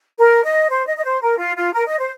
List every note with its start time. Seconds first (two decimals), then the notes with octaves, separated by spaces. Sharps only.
0.19 A#4
0.44 D#5
0.70 C5
0.87 D#5
0.98 D#5
1.04 C5
1.22 A#4
1.38 F4
1.56 F4
1.73 A#4
1.87 D#5
1.99 C5